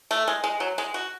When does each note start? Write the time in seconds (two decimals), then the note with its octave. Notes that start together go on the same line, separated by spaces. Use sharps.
0.11 A3
0.28 G#3
0.44 G#3
0.60 F#3
0.78 G#3
0.94 F#4